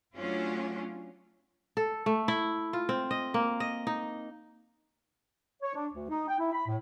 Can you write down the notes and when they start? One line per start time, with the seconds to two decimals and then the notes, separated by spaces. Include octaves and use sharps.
0.16 F#3 A3 C#4 D4 F4
1.77 A4
2.06 A3
2.28 E4
2.73 F4
2.89 C4
3.11 D#5
3.34 A#3
3.60 D#5
3.87 D#4
5.63 C#5
5.75 D4
5.93 D2
6.09 D#4
6.28 G5
6.39 E4
6.53 B5
6.67 A2